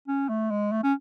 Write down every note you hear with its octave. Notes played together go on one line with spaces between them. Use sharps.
C#4
A3
G#3
A3
C#4